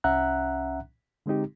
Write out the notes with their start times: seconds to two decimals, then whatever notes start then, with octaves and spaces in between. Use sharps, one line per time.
0.04 C2 C#4 E5 F#5 A#5 F#6
1.26 D3 G#3 C4 D#4 G4